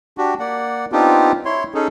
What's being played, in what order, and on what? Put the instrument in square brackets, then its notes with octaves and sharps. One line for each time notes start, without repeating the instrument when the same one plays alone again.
[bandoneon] D4 F#4 G4
A#3 D5 F#5
B3 C4 D4 D#4 F4 G4
E4 C#5 C6
C#4 D#4 G#4 A4